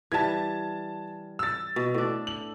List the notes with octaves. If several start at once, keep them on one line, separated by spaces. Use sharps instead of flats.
E3 G3 A5 G#6
E6 A6
B2
A2 D4
F#7